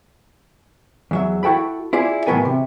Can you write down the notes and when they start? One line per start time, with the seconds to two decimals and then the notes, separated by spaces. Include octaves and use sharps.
1.11 E2 F#3 E5
1.43 E4 F#4 A4 G5 B5
1.93 E4 F4 G#4 D5
2.27 A2 E3 F#3 B3 A#4 G#5
2.45 C3